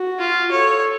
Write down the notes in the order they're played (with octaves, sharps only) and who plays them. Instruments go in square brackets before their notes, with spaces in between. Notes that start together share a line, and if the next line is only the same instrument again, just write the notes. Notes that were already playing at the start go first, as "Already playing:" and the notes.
Already playing: [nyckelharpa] F#4
[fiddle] F4
[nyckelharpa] A4 [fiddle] C#5